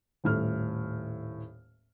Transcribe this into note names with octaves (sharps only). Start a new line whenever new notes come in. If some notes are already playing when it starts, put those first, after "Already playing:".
D#1 A2 F6